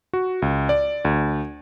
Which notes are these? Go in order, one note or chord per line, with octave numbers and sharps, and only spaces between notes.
F#4
C#2
D5
D2